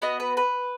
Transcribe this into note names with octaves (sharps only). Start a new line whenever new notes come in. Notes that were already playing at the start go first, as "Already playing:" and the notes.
B3 F#4 D#5
B4
B4